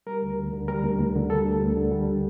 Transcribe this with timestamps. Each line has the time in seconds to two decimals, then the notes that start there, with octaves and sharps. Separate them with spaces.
0.07 G3 A#4
0.22 D2
0.38 D2
0.53 D3
0.68 G3 A#4
0.84 D2
0.99 D2
1.16 D3
1.30 G3 A4
1.45 D2
1.62 D2
1.77 D3
1.92 G3